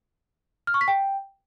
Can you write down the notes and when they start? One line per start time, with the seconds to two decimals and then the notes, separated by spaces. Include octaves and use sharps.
0.67 F6
0.74 C#6
0.81 B6
0.88 G5